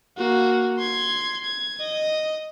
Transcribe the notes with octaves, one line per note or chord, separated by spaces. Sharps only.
A#3 F#4
C6 G#6
G#6
D#5